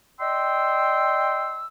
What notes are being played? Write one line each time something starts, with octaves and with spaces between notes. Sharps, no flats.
D5 D#5 G5 C6 E6